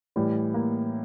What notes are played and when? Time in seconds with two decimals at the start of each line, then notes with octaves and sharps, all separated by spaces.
0.16 A2 E3 G3
0.54 A#3